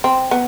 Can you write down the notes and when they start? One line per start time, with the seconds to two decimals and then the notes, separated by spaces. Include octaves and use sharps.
0.04 C4
0.31 B3